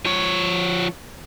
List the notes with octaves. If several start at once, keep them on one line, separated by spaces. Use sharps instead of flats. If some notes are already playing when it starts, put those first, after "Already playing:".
F3 C#5